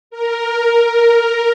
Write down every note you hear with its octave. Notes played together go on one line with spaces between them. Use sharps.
A#4